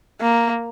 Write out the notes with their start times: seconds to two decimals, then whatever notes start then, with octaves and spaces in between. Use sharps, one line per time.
0.21 A#3